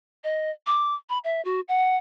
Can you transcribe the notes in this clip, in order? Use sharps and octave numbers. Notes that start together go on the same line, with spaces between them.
D#5
D6
B5
E5
F#4
F#5